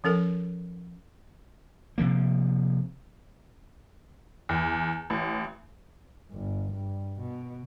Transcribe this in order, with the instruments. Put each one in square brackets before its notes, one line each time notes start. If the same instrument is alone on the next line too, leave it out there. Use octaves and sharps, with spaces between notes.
[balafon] F3 C#4 A4 A#4
[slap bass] C3 F3 A#3
[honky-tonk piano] E2
A1
[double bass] G1
G2
B2